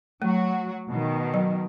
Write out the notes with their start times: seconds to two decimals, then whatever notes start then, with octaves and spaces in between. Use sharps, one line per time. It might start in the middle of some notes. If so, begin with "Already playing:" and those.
0.22 F#3 A3 F#4
0.90 B2 D#3
1.34 F#3